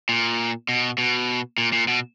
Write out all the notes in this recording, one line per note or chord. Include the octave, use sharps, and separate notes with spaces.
A#2
B2
B2
A#2
A#2
B2